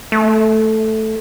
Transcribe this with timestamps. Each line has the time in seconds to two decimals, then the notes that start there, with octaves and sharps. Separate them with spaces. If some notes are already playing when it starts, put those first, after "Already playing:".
0.12 A3